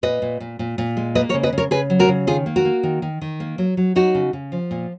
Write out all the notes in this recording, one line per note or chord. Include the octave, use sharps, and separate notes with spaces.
A#2 B4 D#5
A#2
A#2
A#2
A#2
G#3
A#3 B4 D#5
A#4 C#5
C#3
B4 D#5
C#3
A#4 C#5
C#3 G#4 B4
F#3
F#4 A#4
C#3
D#3 F4 G#4
A#3
F#4 A#4
A#3
D#3
D#3
D#3
A#3
F#3
F#3
F#3 D#4 F#4
C#3
C#3
F3
A#2